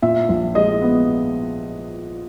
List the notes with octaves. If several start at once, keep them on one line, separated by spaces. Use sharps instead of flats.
A#2 E5
A#1
G#3 D#5
B3